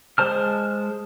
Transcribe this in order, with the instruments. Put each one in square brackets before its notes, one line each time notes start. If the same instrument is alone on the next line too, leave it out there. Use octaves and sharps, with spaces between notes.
[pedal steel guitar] G#3 C5 A5 F6